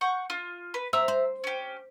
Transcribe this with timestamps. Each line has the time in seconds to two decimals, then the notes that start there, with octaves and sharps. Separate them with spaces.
0.01 F#5 C#6 G6
0.30 F4
0.74 B4
0.93 C4 E5 A#5 E6
1.08 C5
1.44 C#4 G4